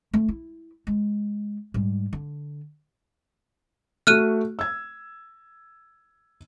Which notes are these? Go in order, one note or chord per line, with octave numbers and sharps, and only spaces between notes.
A3
E4
G#3
G#2 G3
D3
A3 F#4 F6 F#6 D#7
E6 G#6